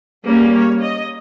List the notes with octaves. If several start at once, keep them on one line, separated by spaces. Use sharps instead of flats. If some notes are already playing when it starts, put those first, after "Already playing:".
G3 A#3 C#4 G#4
C#5
D#5